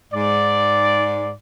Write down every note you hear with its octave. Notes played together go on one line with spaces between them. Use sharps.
G#2 D5